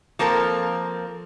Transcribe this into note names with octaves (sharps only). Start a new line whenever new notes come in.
F3 A#3 C4 A4 A#4